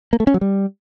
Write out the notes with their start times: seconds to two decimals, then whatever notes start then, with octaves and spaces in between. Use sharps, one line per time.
0.13 A#3
0.20 A3
0.27 C#4
0.34 F#3
0.41 G3